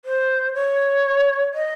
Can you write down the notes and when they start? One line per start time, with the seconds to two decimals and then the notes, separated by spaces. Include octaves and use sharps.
0.05 C5
0.54 C#5
1.54 D#5